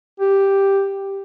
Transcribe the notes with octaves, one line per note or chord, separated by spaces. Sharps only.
G4